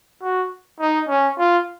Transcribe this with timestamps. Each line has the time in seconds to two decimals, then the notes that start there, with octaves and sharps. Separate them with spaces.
0.22 F#4
0.80 D#4
1.08 C#4
1.38 F4